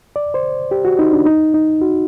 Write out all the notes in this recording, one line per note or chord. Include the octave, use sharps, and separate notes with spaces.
D5
C5
G4
F#4
D#4
D4
D#4
D#4
F#4